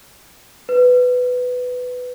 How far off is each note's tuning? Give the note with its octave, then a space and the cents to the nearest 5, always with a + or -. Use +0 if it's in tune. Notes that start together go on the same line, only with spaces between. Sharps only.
B4 +10